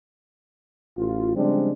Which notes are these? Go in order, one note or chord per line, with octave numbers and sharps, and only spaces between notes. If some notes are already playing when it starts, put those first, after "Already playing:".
A1 F4
C#3 F3 G3 G#3 C4 D4